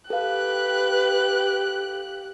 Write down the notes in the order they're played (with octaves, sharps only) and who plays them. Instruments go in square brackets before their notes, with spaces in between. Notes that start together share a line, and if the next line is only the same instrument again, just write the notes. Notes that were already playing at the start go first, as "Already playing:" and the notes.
[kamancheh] G4 F#6 [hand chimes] A4 F5 [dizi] B4